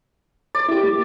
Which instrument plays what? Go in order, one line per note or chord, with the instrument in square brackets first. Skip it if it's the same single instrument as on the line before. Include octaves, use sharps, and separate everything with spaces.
[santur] D5
[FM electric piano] E4 G4
A#3